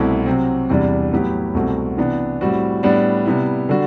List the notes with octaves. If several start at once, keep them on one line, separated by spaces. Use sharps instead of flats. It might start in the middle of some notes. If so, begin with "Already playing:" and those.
Already playing: C2 B2 A3 C4 E4
C3 F#3 C4
E2 C3 E3 G3 D4
A2 F#3 B3 E4 G4
C2 B2 A3 C4 F#4
C3 E3 B3 D4
A2 G3 C4 F#4
A2 G3 B3 D4
C3 G3 B3 E4
D3 G3 D4 F#4